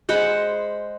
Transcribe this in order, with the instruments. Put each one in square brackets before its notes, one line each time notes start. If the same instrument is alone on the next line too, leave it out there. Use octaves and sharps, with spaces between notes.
[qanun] G#3 C5 F#5 B5